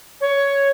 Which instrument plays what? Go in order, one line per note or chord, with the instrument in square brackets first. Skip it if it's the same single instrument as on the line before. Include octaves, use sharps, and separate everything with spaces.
[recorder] C#5